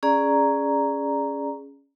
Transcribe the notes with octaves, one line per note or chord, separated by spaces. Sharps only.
C#4 G#4 D5 A#5